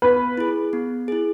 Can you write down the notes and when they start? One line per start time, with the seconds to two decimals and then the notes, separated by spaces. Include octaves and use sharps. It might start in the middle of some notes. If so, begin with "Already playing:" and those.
0.02 B3 B4
0.38 E4 G#4
0.73 B3
1.08 E4 G#4